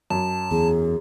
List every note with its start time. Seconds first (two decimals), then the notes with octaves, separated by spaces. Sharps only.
0.10 F#2 A5
0.51 E2 G#4